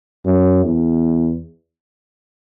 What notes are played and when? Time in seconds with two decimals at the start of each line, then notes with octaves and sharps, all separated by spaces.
0.25 F#2
0.65 E2